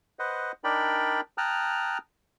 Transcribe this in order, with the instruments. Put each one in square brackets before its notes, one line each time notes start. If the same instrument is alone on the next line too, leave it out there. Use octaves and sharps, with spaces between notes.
[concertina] B4 C5 D#5 F#5
D4 D#4 A#4 D5 G5 B5
G5 A5 A#5 D#6 F6 F#6